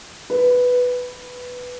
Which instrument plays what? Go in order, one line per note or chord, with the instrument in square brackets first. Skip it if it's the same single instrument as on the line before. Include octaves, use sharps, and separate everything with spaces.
[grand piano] B4